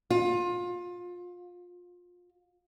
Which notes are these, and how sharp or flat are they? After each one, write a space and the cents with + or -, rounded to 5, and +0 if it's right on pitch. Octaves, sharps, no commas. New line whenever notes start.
F4 +25